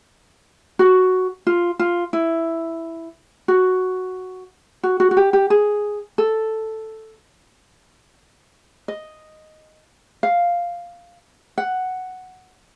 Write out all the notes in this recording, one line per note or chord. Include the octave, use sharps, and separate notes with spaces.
F#4
F4
F4
E4
F#4
F#4
F#4
F#4
G4
G4
G#4
A4
D#5
F5
F#5